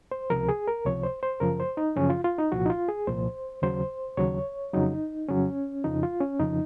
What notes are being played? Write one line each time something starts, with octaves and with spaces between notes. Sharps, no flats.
C5
C#2 C3 F3 A#4
G#4
A#4
C#2 C3 F3 C#5
C5
C5
F#2 C#3 F3 A#4
C5
D#4
F#2 C#3 F3 C#4
F4
F4
D#4
C2 A#2 F3 F#4
D#4
F4
G#4
C2 A#2 F3 C5
D#2 C#3 F#3 C5
D#2 C#3 F#3 C#5
F2 C#3 F#3 D#4
F2 C#3 F#3 C#4
F2 C#3 F3 D#4
F4
C#4
F2 C#3 F3 D#4